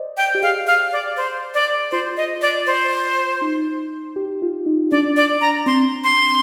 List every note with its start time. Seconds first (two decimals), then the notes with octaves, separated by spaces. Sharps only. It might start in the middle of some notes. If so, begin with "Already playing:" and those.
Already playing: C5 D5 D#5
0.17 G5
0.35 G4
0.42 G#4 F5
0.67 F5
0.92 D5
1.17 C5
1.54 D5
1.91 F4 C5
2.17 D#5
2.42 D5
2.66 C5
3.41 D#4
4.16 G4
4.42 F4
4.66 D#4
4.91 D4 D5
5.17 D5
5.41 A#5
5.66 C4 C6
6.04 C6